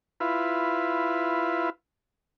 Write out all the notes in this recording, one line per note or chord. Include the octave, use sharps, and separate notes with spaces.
E4 F4 B4